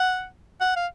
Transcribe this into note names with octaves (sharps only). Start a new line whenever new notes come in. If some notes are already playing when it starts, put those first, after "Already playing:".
Already playing: F#5
F#5
F5